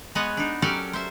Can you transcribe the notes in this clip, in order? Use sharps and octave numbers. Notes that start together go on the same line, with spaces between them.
G#3 B3 B4 C#5 D#5 F#5
D4 D#4
F#3 C#4 G4 A4 A#4 D5
C5 E5